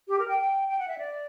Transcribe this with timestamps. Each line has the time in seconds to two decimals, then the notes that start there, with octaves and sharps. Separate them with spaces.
0.08 G4
0.19 A#4
0.28 G5
0.39 G5
0.68 G5
0.79 F#5
0.88 E5
0.98 D5